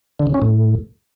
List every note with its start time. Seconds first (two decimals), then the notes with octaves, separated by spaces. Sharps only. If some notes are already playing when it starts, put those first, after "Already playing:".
0.20 D3
0.27 C#3
0.34 C#4
0.42 A2